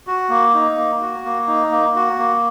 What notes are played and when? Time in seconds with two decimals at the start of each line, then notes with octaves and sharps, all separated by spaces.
0.07 F#4
0.30 A#3
0.54 D#4
0.77 A#3
1.01 F#4
1.25 A#3
1.48 D#4
1.72 A#3
1.96 F#4
2.19 A#3